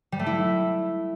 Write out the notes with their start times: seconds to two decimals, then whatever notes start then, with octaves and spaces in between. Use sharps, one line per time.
0.12 G3
0.19 A3
0.26 E4